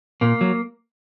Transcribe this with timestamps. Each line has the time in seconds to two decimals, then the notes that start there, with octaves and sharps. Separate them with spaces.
0.21 A#2 A#3
0.41 F#3